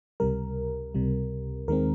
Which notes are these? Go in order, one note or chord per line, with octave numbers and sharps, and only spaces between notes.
C#2 C3 G3 A#4
C#2 C3 G3
D#2 D#3 G#3 C4 A#4